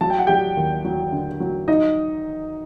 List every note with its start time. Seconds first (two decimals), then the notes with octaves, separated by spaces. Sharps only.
0.01 F#3 A5
0.10 G5
0.19 F#5
0.27 F#3 G4 G5
0.57 D#2
0.85 F#3
1.12 D3
1.40 F#3
1.68 D#4 D#5